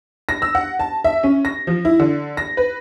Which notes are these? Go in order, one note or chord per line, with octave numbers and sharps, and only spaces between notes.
A#6
E6
F#5
A5
E5
C#4
A#6
F3
E4
D3
A#6
B4